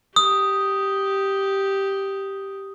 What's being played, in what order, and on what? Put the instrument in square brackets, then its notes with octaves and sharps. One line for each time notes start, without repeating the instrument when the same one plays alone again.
[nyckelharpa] G4 [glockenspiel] D#6